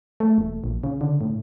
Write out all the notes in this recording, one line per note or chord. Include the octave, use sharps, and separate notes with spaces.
A3
E1
A#1
C#3
D3
A2